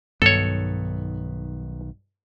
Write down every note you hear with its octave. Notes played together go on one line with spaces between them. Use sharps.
B1 G2 D#3 B3 A4 C#5